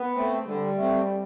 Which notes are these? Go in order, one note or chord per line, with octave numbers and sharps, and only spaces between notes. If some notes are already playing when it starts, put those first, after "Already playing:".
Already playing: B3
A3 C4
D3 G3
A3 C4